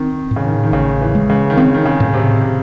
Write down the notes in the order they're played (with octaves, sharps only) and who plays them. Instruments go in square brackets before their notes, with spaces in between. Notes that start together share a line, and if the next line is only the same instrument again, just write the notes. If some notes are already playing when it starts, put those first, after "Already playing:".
Already playing: [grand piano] D#3 [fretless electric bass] C4
[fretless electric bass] A2
[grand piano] C#3
D#3
D#3
[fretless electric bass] A1 [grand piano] C#3
[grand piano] E3
[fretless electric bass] G#3
[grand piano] C#3
D#3
[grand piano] C#3 [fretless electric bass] C4
[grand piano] D#3
C#3
[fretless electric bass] A2
[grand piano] C3
C3